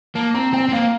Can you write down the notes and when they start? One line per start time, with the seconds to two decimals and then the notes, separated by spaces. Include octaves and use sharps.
0.15 A#3 A5
0.34 C4 A#5
0.53 C4 G5
0.69 C4
0.72 A#3 F5